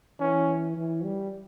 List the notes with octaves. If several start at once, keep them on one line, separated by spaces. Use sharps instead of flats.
E3 C#4
E3
G3